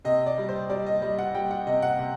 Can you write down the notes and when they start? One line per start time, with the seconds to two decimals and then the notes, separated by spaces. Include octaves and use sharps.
0.05 C3 D#5
0.26 D5
0.38 G3
0.49 C5
0.69 G3 D5
0.86 D#5
1.02 G3 D#5
1.19 F#5
1.34 G3 G5
1.51 F#5
1.66 C3 D#5
1.82 F#5
1.99 C3